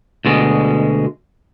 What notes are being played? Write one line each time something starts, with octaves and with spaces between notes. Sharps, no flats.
D2 B2 G#3